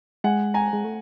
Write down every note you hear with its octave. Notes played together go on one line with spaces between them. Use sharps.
G#3 F#5 G#5
G#5 A#5
G#3
A3